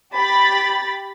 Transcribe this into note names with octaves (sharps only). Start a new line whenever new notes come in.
G4 B5 A6